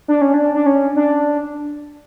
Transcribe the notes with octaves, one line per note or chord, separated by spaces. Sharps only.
D4
C#4
D4
D4
C#4
D4